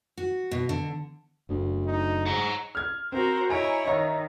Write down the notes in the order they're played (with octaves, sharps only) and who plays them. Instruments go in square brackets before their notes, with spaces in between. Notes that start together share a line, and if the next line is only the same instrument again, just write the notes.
[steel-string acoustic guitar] F#4
B2
D3
[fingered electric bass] F#1 [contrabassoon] D2
[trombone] D#4
[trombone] G#2 [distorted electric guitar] F#5 A#5
[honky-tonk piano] F6 G#6
[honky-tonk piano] C4 [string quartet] F#4 A#4 C5
[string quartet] E4 C#5 D#5 [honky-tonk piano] G#5 A#5 D7
[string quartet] D#3 [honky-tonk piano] C#5 E5 A#5